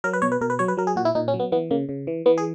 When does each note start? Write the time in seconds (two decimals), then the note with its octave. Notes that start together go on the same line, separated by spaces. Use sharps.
0.04 F#3 A#4
0.13 B4
0.22 B2 C#5
0.32 B4
0.41 B2 A#4
0.50 B4
0.59 F#3 C#5
0.68 B4
0.77 F#3 A#4
0.87 G#4
0.96 A#2 F#4
1.05 E4
1.15 A#2 D#4
1.28 C#4
1.34 F#3
1.40 B3
1.52 E3 B3
1.71 C#3 A#3
1.89 C#3
2.07 E3
2.26 E3 B3
2.38 G#4